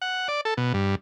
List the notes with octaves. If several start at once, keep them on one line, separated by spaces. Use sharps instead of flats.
F#5
D5
A4
B2
G2